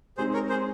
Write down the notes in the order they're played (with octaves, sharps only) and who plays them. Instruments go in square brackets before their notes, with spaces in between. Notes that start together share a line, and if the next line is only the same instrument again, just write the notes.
[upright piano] G#3 C4 D#4 [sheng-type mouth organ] G#4 C5
[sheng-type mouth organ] A#4 C#5
G#4 C5